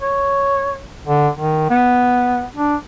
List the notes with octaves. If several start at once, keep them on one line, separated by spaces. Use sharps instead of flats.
C#5
D3
D#3
B3
D4